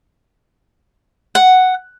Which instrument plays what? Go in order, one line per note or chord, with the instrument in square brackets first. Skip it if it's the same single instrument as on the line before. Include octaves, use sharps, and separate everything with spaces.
[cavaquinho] F#5